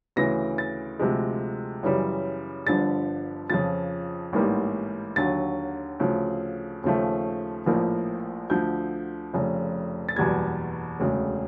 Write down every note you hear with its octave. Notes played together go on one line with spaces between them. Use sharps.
D2 C#3 E3 A#6
A6
D2 C3 F3 G#3
F#2 C#3 E3 G3
G1 G2 D3 F3 A6
F2 C#3 F3 A6
A1 G#2 E3 G3 A#3
D#2 D3 F#3 A6
D2 C#3 F3
D#2 C#3 F3 A3
A#1 A2 F3 A#3
D2 D3 F3 G6
F1 F2 C#3
A6
F#1 E2 B2 G3 G#6
E1 D2 C#3